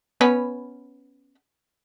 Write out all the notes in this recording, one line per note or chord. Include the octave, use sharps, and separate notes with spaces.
B3 C#4 B4